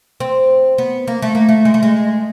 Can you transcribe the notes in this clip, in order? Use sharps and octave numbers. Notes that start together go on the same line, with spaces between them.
C4
B3
A#3
A3
A#3
A3
G#3
A3
G#3